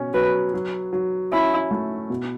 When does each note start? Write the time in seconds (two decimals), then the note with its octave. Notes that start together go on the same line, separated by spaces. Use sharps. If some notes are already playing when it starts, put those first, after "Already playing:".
Already playing: B2 C#4
0.14 F#3 B4
0.54 F#3
0.93 F#3
1.32 C#4 E4
1.71 A3
2.10 B2